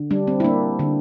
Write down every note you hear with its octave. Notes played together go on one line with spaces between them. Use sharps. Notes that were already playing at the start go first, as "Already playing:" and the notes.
Already playing: D3
G3 D4
C4
E4
A#3 D4
D3